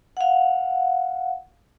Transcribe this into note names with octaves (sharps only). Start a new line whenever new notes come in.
F5 F#5